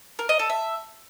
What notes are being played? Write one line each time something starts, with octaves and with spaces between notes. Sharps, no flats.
A#4
D#5
A4
E5